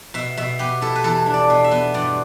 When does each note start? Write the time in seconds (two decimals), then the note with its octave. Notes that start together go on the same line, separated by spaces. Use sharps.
0.14 B2 E5
0.37 B2 E5
0.59 B3 G4
0.81 E4 A4
0.96 B4
1.04 E2 A4
1.26 D4
1.34 D5
1.50 B2
1.64 E5
1.71 B3
1.94 G2 D5